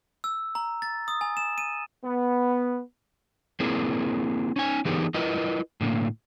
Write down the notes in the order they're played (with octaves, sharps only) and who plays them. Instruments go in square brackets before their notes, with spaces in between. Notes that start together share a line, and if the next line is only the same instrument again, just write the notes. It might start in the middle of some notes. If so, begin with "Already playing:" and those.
[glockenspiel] E6
A#5
A6
D#6
G#5
E7
D#7
[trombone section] B3
[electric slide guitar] A#3 C4 E4 G#4 A#4
C#4 D#4 G#5
E3 B3 D#4 G4 G#4 A#4
E4 F4 A#4 B4 D#5
A2 D3 G3 A#3